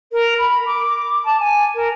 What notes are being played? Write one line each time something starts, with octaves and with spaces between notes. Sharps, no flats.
A#4
B5
D6
A5
G#5
A#4